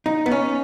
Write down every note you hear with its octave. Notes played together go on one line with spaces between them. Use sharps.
D#4
B3
C#4